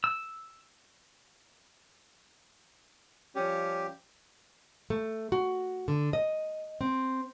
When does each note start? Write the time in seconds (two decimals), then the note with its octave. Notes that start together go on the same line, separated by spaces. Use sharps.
0.04 E6
3.35 F3 G3 C#4 G4
4.90 A3
5.32 F#4
5.88 D3
6.13 D#5
6.81 C4